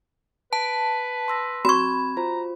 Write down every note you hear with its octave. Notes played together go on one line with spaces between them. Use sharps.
B4 A5
C6 E6 A#6
C4 F#4 B5 C#6 G#6
F4 C5 A#5